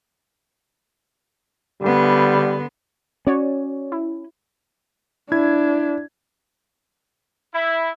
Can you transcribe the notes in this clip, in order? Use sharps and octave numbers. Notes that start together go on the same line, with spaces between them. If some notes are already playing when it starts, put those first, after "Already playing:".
D3 G3 B3
C#4 F#4 C#5 D5
E4
D4 E4 G#6
E4